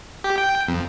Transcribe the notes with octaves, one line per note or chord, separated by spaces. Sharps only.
G4
G5
F2